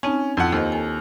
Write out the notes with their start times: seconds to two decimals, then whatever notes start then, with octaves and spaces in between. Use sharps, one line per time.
0.03 C4 C#4 D#4 A5
0.37 F2 E4 F4 F#5 A5
0.52 D#2 A4 C5 D#5
0.72 A4 G#5